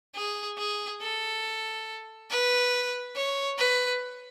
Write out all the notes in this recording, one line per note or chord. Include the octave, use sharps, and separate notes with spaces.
G#4
G#4
A4
B4
C#5
B4